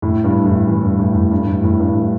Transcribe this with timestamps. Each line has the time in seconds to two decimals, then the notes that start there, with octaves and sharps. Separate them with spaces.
0.02 A2
0.24 G2
0.45 A2
0.67 E3
0.83 G2
0.99 A2
1.15 A2
1.31 G2
1.47 A2
1.64 A2
1.79 G2
1.96 A2